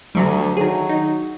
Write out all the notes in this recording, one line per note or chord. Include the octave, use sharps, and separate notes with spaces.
D2 D3 F#3 G3
D#3 F#3 G#4
D#4